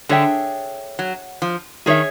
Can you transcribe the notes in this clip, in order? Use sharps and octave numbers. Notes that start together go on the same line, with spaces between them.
D3 G#4 C#5 E5 G5
F#3
F3
D#3 G#4 C#5 E5